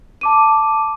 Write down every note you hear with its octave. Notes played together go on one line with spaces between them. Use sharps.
A5 D6 D#7